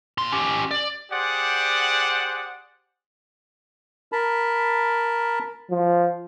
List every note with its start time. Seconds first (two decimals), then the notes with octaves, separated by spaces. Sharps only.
0.18 A#2 C6
0.32 C#4 G4
0.71 D5
1.11 G4 G#4 C5 D5 F#5
4.12 A#4 A5 B5
5.71 F3